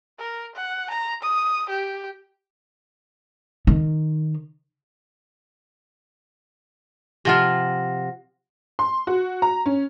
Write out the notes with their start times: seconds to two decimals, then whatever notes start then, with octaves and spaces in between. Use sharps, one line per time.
0.19 A#4
0.55 F#5
0.90 A#5
1.23 D#6
1.69 G4
3.67 D#3
7.25 C3 F3 F4 F#5 A#6
8.79 C6
9.07 F#4
9.42 A#5
9.66 C#4